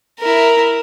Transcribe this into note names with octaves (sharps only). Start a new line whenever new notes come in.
E4 A#4